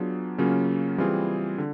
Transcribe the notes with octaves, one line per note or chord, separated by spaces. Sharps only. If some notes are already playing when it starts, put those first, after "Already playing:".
Already playing: F#3 B3 D4 F4 G#4
C#3 F#3 A#3 C#4 F4
E3 G3 C4 F4 G#4
D3